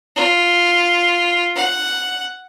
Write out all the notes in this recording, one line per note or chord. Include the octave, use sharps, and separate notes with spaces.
F4
F#5